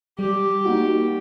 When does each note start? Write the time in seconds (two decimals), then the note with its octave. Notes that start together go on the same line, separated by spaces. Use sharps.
0.19 G3 G4
0.65 A#3 D#4 F#4